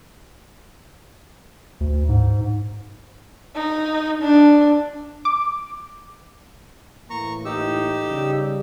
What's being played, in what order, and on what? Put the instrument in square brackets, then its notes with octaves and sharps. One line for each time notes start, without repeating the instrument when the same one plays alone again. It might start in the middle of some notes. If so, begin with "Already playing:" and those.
[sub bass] D2
G#2
[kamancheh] D#4
D4
[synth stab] D6
[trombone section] A2 E3 A#3 [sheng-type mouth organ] A#5 C#6
[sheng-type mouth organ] D#4 G4 E6
[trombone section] C#3 G3